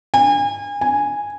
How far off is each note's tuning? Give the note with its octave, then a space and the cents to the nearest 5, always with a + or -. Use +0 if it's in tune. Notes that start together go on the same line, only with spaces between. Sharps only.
G#5 -35
G#5 -5